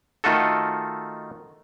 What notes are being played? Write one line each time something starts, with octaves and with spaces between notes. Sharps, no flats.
D#3 A3 F4 F#4 A4